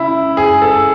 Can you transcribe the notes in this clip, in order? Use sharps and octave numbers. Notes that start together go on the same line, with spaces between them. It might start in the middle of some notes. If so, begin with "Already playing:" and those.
Already playing: C#3 E4
G#4
A4